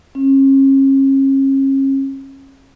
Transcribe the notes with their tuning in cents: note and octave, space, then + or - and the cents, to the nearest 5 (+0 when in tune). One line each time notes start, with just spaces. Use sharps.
C#4 -40